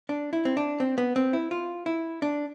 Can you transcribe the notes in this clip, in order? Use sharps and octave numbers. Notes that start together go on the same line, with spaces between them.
D4
E4
C4
D4
C4
B3
C4
E4
F4
E4
D4